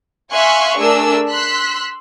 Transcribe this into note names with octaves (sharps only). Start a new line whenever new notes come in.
E5 F5 G#5 C6 C#6 F#6
A3 D4 G#4 A#4 E6
C6 E6 F#6 B6